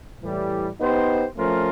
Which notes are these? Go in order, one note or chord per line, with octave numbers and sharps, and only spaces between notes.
A2 E3 G3
B3 D#4 G4 C5
F3 A3 C#4 F4 A#4